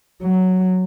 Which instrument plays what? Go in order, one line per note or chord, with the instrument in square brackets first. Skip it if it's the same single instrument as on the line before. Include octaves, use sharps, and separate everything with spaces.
[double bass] F#3